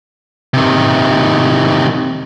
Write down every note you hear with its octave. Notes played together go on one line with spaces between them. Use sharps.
C3 D#3